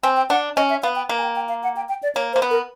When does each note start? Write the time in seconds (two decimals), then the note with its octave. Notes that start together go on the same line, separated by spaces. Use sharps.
0.03 C4 G#5
0.17 G5
0.30 D4 F#5
0.56 C#4 D#5
0.70 E5
0.83 B3 F5
0.96 G5
1.09 A#3
1.18 G#5
1.23 G5
1.36 G5
1.49 F5
1.63 F#5
1.76 G5
1.89 G5
2.03 D5
2.15 A#3 C#5
2.33 C5
2.36 A#3
2.42 B3
2.51 A#4